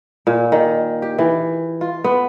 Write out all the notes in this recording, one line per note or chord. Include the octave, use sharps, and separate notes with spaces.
A#2
D#3
G4
E3
F4
B3